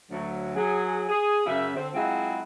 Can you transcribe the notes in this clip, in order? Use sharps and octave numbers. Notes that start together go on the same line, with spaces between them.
D2 F#3
F#3 G#4
G#4
F#2 C#3 E5
D3 C4
F#3 G#3 C4 E4 F4 G#4